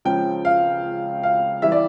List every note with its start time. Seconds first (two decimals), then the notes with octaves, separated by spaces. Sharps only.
0.05 C#2 C#3 F3 G5
0.45 F5
1.23 F5
1.62 E3 G3 E5
1.72 D5